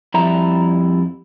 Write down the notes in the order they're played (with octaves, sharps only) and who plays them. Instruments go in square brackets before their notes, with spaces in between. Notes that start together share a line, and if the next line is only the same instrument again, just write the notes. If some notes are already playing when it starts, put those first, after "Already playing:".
[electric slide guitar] F2 G3 E4 A#5